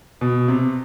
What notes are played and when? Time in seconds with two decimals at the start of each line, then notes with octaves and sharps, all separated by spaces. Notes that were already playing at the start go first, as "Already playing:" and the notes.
0.21 B2
0.48 C3